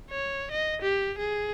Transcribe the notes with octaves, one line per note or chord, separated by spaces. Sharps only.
C#5
D#5
G4
G#4